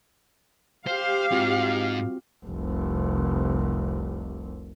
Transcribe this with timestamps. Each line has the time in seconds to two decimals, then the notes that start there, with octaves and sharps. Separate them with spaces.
0.87 G4 C5 F5
1.32 G#2 C4 F4 F#4
2.45 F1 C2